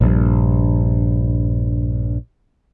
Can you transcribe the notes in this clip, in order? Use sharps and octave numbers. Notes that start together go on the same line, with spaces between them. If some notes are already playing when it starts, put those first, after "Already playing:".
A#1 G2